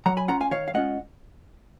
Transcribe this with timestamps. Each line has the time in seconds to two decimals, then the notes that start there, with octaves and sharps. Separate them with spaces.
0.06 F#3 F#5 A#5
0.17 G#5 B5
0.28 C#4 F4 F#5 A#5
0.41 F5 G#5
0.51 D#3 C#5 F5
0.68 F5
0.74 G#3 C#4 F4 D#5 F#5